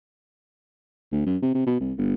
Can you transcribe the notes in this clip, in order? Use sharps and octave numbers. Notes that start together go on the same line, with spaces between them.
D2
F#2
C3
C3
B2
C2
G1